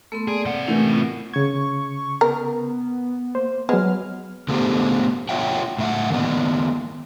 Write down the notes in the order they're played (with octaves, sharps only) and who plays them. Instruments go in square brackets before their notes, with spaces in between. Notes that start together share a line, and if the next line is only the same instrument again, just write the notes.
[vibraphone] A3 B3 C6 [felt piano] A4
[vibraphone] A#3 D5 [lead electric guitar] G#4
[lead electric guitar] C3 F#5
[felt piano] A2 E3 A3 [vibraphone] C#4 G4 A#4
[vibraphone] B3 F4
[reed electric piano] C#3 G#6 [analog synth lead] C#6
[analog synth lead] B3 [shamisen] A#4
[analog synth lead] A#3 [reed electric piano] C5
[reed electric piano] F#3 B3 [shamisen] G#3 [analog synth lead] F6
[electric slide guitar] D3 A3 B3 G4 A4 C5
F4 C#5 E5 F#5 G5
A2 E5 F#5
D#3 A#3 B3 D5 D#5